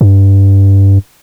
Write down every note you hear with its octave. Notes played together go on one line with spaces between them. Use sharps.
G2